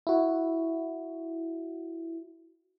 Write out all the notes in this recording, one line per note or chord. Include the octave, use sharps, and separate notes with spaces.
E4 F#4